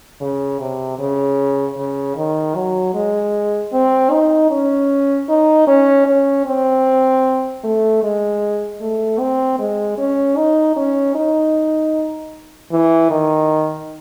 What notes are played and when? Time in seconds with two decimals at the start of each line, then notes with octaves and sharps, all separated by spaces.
0.21 C#3
0.60 C3
0.99 C#3
1.77 C#3
2.16 D#3
2.55 F#3
2.94 G#3
3.73 C4
4.11 D#4
4.51 C#4
5.29 D#4
5.67 C#4
6.07 C#4
6.46 C4
7.63 A3
8.03 G#3
8.81 A3
9.20 C4
9.59 G#3
9.98 C#4
10.37 D#4
10.76 C#4
11.15 D#4
12.71 E3
13.10 D#3